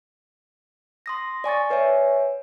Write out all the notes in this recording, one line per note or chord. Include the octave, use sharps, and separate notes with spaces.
C6 D#6 A#6
D5 G#5 C#6 A6
B4 C#5 E5 G#5